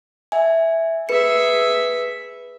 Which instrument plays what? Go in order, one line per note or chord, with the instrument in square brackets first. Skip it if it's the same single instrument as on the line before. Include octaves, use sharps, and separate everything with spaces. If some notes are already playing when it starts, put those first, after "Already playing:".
[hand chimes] E5 G#5
[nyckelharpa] G#4 E5 [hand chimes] B4 C#7